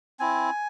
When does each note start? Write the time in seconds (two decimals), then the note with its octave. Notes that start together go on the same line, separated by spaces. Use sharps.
0.20 C4 E4 G#5